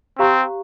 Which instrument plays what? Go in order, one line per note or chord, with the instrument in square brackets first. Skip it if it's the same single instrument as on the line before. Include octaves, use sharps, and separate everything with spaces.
[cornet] C4 [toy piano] G4 C5 F5 A#5 C#6